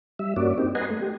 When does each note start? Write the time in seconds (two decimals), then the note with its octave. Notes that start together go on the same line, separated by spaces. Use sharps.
0.19 G3 E5
0.36 G2 A#3 C#4 F#4 D5
0.58 C4 D#4 G4
0.75 B4 D#5 F#5 G#5 A#5 C6
0.90 A3
1.02 G4